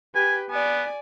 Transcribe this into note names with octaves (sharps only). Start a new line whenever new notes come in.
G4 B4 G#5
B3 D5 G#5